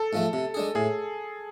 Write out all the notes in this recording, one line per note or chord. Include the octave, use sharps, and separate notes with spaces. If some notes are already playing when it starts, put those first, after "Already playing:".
Already playing: A4
G#2 F3 A3
C3
G#3 D4 G#4
A2 G#4